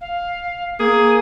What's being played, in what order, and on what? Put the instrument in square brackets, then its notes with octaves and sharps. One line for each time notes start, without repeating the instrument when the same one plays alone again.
[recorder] F5
[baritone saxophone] A#3 [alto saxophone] G#4 [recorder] D#6